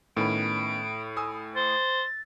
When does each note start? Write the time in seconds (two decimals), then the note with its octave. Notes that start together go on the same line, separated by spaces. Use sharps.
0.17 A2 D#3 B3 C#4 B5 D7
1.17 G#5 D#6 E6
1.55 C5 A6